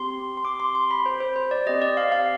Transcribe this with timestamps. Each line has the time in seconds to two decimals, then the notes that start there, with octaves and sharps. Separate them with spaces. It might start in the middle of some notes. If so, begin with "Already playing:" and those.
Already playing: C4 G4 C6
0.37 C6
0.45 D6
0.60 C6
0.75 C6
0.91 B5
1.06 C5
1.20 C5
1.36 C5
1.51 D5
1.66 C4 G4 D#5
1.82 D5
1.97 F5
2.12 F5